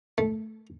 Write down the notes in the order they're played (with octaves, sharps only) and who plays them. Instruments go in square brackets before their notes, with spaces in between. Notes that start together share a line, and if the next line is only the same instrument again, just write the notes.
[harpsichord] A3